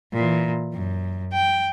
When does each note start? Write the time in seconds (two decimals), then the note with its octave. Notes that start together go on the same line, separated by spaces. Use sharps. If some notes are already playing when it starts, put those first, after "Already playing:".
0.13 A#2 E3
0.73 F#2
1.33 G5